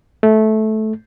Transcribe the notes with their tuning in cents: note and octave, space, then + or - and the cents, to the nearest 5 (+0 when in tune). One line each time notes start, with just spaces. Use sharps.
A3 -15